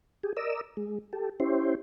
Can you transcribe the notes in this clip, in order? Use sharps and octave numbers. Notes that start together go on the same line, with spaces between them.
G4 G#4
A#4 D5 D#5 E6
G#3
G4 A4
C#4 E4 G4 C5